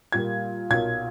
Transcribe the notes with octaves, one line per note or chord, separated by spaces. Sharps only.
A#2 G3 A#3 G#6
B1 A#2 A#3 G#6